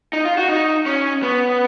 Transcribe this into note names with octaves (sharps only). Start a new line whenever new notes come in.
D#4
F4
F#4
D#4
C#4
B3